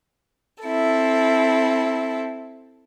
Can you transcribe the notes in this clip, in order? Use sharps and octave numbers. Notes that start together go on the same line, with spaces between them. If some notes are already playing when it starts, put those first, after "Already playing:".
C4 E4 A4